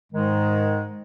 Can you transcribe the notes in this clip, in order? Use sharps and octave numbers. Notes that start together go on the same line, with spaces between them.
G#2 D#3 G#3